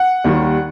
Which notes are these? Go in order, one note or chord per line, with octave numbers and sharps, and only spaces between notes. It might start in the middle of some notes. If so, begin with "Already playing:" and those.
Already playing: F#5
D#2 D#3 G3